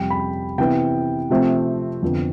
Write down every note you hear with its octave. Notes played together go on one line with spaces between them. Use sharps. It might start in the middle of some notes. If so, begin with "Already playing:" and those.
Already playing: F2 C3 G3 G5
B5
C3 E3 B3 G5
C3 F3 A3 C4
F2 D3 F3 B3